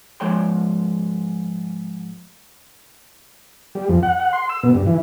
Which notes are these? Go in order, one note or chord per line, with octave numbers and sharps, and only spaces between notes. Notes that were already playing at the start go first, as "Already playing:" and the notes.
G#2 F3 G#3 C#5 G5 C6
G3
F2
F#5
F#5
C6
E6
B2
G2
E3